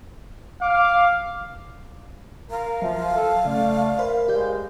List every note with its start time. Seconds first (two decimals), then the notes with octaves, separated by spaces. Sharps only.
0.62 F5 D6
2.51 A#4 F5
2.82 F3 F#3 E5
3.14 A4
3.45 C#3 A3 D5
3.99 A#4 C5 B5
4.28 G#3 G4 D5 G6